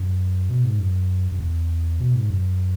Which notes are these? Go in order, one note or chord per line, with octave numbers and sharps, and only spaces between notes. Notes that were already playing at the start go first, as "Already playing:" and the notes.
Already playing: F#2
B2
G#2
F#2
F#2
E2
B2
G#2
F#2